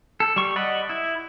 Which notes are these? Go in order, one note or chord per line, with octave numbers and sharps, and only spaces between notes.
A4
G3 C#6
D5 D#5 F#5 B5
E4